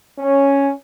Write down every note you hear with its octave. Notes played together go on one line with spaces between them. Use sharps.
C#4